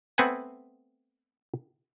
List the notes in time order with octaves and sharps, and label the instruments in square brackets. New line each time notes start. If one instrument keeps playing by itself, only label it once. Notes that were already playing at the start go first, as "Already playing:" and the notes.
[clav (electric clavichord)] A3 B3 C4 B4 F#5 G#5